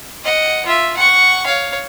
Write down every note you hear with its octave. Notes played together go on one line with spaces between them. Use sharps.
D#5 F#5
F4 E5
F#5 C#6
C#5 F5